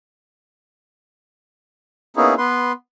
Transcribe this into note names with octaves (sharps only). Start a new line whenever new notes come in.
A#3 B3 C#4 D#4 E4 G#4
B3 B4 C6